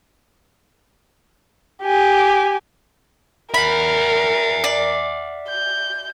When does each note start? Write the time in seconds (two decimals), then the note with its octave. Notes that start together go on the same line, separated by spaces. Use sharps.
1.82 G4 G#5
3.54 A#4 E5 F#5 B5
4.64 D5
5.49 G6